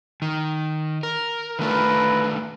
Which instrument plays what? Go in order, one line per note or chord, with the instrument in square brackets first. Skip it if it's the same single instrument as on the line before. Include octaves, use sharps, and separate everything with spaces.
[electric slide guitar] D#3
A#4
[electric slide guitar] D#3 A3 D4 [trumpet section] F4 A#4 B4